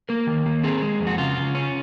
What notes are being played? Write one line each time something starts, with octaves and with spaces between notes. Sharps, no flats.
A#3 A#4
D#3
A#3
C4 G#4
G#3
F2
F#4
C#3 F4
C#3
C#4